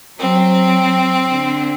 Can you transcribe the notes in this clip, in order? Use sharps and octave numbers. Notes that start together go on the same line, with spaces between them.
F#3 C4
D3